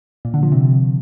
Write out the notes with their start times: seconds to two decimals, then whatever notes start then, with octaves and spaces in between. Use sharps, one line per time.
0.25 A#2
0.34 D3
0.43 F3
0.52 C3